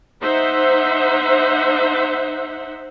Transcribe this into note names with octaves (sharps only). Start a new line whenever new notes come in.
D#4 C5 E5 F#5